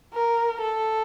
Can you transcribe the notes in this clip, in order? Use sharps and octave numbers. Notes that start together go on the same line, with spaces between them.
A#4
A4